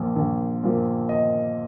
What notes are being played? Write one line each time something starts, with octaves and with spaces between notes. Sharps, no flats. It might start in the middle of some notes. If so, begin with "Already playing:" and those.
Already playing: A#1 A#2 F3
A#1
A#2 F3
D#5